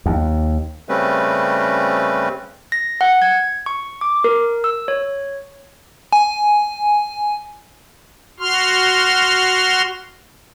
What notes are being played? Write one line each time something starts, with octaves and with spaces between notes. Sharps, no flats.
D#2
C#3 G3 A3 C4 C#4 B4
A#6
F#5
G#6
C#6
D6
A#4
E6
C#5
G#5
F#4 C6 F6